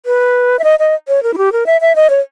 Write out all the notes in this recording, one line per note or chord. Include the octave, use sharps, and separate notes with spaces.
B4
E5
D#5
D#5
C#5
A#4
E4
G4
A#4
E5
E5
D#5
C#5